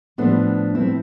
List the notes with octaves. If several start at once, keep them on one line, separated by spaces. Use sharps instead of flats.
A2 F3 B3 D4
C4 E4